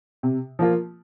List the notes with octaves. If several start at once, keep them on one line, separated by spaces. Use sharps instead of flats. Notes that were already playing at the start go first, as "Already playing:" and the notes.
C3
F3 A#3 F4